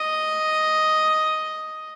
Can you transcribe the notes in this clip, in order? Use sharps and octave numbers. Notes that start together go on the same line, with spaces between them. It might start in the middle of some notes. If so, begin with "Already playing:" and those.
Already playing: D#5